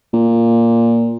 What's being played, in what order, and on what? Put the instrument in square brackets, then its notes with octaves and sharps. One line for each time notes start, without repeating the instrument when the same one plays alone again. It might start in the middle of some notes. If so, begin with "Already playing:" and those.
[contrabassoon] A#2